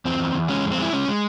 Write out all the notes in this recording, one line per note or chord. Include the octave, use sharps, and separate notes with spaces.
E2 C4
E2
E2
G#3 C#4
F2
C4
G#3 E4
G#3 C#4
G#3